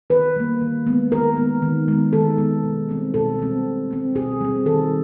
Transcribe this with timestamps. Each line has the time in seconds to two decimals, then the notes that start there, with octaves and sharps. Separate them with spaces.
0.10 D#3 B4
0.36 G3 A#3
0.61 D#3
0.87 G#3 B3
1.12 D#3 A#4
1.37 G#3 B3
1.62 D#3
1.88 G#3 B3
2.13 D#3 A4
2.38 G#3 B3
2.63 B2
2.89 G3 C4
3.14 B2 A4
3.39 G3 C4
3.65 B2
3.91 G3 C4
4.15 B2 G#4
4.41 G3 C4
4.66 D#3 A4